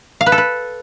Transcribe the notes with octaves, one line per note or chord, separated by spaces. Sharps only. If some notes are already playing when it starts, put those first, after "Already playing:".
F5
B4
A4
B4